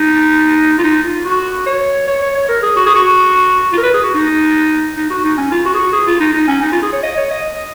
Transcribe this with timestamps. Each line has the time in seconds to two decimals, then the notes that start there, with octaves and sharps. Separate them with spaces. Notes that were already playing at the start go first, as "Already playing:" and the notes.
Already playing: D#4
0.79 F4
0.84 D#4
1.04 F4
1.25 F#4
1.66 C#5
2.08 C#5
2.22 C#5
2.35 C#5
2.49 A#4
2.63 G#4
2.76 F#4
2.86 G#4
2.95 F#4
3.73 F4
3.78 A#4
3.83 B4
3.94 G#4
4.04 F#4
4.14 D#4
4.97 D#4
5.11 F#4
5.24 D#4
5.38 C#4
5.52 F4
5.65 F#4
5.74 G#4
5.79 F#4
5.93 G#4
6.07 F4
6.20 D#4
6.34 D#4
6.48 C#4
6.62 D#4
6.72 F4
6.83 G#4
6.93 C#5
7.03 D#5
7.17 C#5
7.31 D#5
7.56 D#5